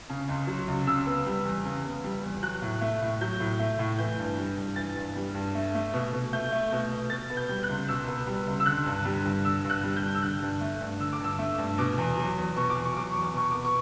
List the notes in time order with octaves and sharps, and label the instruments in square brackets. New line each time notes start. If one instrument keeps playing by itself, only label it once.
[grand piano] C#3
C#2
F#3
C#2
C#3 E6
B3
G3
E2
C#3
B3
G3
E2
F#3 F#6
A2
A3
A2
F#3 G6
A2
A3
A2
E3 G6
G2
G3
G2
E3 A6
G2
G3
G2
A3
A3
B2
B2
A3 G6
A3
B2
B2
B2 A6
B3
G6
G3
F#6
C#2
B2 E6
B3
G3
C#2
E6
D3 F#6
G2
G3
G2
D3 E6
G2
F#6
G3
G6
G2
E6
D3 F#6
G2
A3
G2
D3 E6
D6
G2 E6
A3
G2
B2 D6
E2
F#3
E2
B2 C#6
D6
E2
C#6
F#3 D6
E2 C#6
D6
B2 C#6
B3 D6
C#6